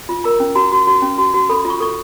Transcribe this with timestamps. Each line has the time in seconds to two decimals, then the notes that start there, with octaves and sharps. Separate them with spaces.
0.09 F4
0.24 A#4 A#5
0.40 C#4
0.55 F#4 A#5
0.72 F#4
0.87 F#4
1.02 C#4
1.18 F#4
1.34 F#4
1.49 A4 B5
1.65 F4
1.70 C#6
1.80 A4 C#6